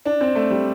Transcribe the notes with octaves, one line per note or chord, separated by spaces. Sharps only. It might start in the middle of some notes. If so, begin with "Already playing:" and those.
D4
C4
A3
G3